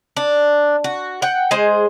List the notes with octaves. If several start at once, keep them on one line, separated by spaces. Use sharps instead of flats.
D4
F#4
F#5 G5
G#3 G#4 C5